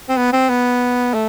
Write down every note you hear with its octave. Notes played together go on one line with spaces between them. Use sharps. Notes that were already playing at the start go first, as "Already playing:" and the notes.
C4
B3
C4
B3
A3